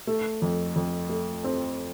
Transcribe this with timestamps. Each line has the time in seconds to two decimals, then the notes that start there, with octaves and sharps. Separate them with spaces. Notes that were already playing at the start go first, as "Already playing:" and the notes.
0.07 A3
0.42 F2
0.76 F2
1.09 A3
1.44 C4